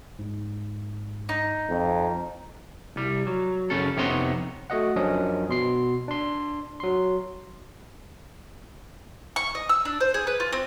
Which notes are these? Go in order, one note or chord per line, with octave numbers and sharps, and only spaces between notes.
G#2
D#4
F2
C2 G3
F#3
F#2 C#3 C#4 A4
F2 C3 B3 D#4 C#5 C6
A3 F#4 D#5 F#5
F#2 F3 C#4 D4 D#5 D#6
B2 C6 C7
D4 C6
F#3 C6
C#6
D#5
E6
D4
C5
G#4
B4
F4
C4